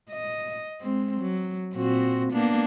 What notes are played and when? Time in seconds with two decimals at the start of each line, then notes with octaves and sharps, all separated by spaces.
0.11 D#5
0.80 G#3 C4
1.20 F#3
1.74 A#2 C4 F#4
2.33 A#3 B3 D4